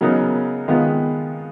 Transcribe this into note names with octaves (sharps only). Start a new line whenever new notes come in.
C#3 F#3 B3 D#4 A#4
D#3 G#3 B3 F4 B4